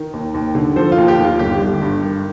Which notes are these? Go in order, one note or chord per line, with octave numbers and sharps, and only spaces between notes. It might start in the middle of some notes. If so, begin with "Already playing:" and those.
Already playing: D#3
D#2
D#2
D3
F3 A4 C5
F4
D#2
G4
D#2
F4
G1 G4
G1
G2
D#3